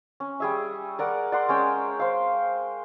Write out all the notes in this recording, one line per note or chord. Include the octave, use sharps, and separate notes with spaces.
C#4
G3 G#4 E5
A#4 D5 F#5
D5 F#5 C6
G#3 C#4 G5
C5 F5